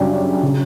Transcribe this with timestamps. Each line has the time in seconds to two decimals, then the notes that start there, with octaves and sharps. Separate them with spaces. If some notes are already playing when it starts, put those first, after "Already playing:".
Already playing: F#2 C#3 G3 D4 G4
0.43 C#3 F#3